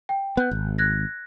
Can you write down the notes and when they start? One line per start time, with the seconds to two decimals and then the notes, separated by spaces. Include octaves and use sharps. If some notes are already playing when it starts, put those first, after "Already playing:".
0.09 G5
0.37 B3 F#6 G6
0.51 G#1
0.78 F#6 G#6 A#6